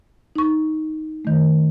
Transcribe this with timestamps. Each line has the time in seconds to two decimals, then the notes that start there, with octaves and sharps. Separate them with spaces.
0.35 D#4 C#6
1.25 D#3 A3